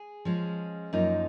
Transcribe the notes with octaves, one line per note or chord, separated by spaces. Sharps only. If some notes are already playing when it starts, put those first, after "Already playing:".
Already playing: G#4
F3 G#3 C#4
F#2 F3 A#3 D#4